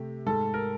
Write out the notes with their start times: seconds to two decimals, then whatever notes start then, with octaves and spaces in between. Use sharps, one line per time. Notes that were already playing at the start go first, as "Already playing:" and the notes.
Already playing: C3 A3 G4
0.26 G#2 A4
0.54 A#4